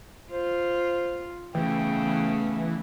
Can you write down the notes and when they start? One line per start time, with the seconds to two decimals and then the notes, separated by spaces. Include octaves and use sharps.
0.32 F4 C5
1.55 C#3 E3 A3 B3 G5